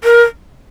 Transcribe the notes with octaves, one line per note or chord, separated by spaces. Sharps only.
A#4